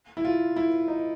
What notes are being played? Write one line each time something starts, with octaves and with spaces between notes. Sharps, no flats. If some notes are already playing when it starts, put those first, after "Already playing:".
E4
F4
E4
D#4